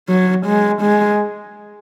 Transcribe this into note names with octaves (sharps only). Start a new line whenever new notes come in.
F#3
G#3
G#3